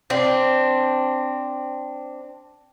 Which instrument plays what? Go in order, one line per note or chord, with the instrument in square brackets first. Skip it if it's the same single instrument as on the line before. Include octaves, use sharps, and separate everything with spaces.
[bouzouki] C4 D4